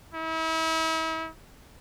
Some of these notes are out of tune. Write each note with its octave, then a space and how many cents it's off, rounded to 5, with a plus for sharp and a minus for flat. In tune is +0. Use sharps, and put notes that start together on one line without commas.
E4 -40